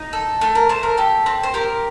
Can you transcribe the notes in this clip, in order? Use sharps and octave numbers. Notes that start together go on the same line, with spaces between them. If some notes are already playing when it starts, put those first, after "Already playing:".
Already playing: D#4
A4
A3 A4
A#4
A3 C5
A#4
G4 A4
C4
C5
G4 A#4